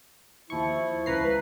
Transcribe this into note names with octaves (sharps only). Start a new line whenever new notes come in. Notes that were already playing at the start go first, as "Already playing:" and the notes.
D#2 F3 E4 C#6
C#2 B4 A#5 C7